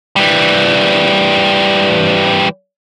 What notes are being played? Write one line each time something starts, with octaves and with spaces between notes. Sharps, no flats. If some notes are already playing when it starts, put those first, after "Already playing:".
E3 G3